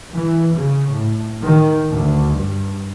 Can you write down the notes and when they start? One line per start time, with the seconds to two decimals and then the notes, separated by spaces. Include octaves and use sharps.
0.14 E3
0.53 C#3
0.90 A2
1.42 D#3
1.88 D2
2.35 G2